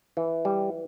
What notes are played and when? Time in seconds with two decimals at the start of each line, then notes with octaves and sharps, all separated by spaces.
0.17 E3
0.45 G3